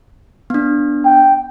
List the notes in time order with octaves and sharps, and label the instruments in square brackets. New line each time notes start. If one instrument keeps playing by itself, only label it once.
[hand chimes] B3 D4
[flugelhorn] G5